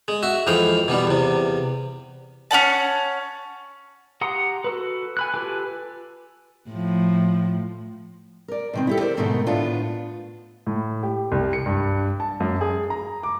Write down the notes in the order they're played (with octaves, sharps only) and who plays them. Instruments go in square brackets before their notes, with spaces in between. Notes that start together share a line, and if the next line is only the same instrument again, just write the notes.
[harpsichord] G#3
F#4 E5
F2 E3 G#3 F5 G5
B2 E3 G3
E2 C3
[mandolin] C#4 E4 F#5 A5
[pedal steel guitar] G4 F#5 A#5 C6 D#6
F#4 A4 B4
G#5 B5 F#6
F4 G4 A4 B4 G#5
[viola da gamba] A2 F3
[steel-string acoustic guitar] A#4 D5
B2 D#3 C4
E4 G4 A4
A#4 C5 D5
G#2 B2 D3 D#3 A3 D#4
A2 B3 D4 F4
[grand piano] A2
G4
C2
C#7
G2
A5
F#2
G#4
A#5
D6